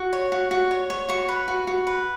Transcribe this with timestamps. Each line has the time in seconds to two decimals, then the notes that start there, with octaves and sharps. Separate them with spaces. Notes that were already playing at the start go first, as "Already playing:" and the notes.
Already playing: F#4
0.13 C#5
0.32 F#4
0.51 F#4
0.71 C#5
0.90 C#5
1.09 F#4 C#6
1.28 B4
1.48 F#4
1.67 F#4
1.87 B4